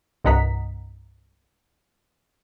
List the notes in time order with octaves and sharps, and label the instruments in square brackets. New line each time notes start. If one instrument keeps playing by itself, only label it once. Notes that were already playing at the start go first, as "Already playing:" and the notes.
[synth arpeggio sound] C2 G2 D#5 F#5 A#5 B6